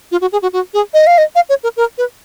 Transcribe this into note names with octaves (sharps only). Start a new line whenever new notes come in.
F4
F#4
G#4
F#4
F#4
G#4
D#5
F5
D#5
F5
C#5
A#4
A#4
B4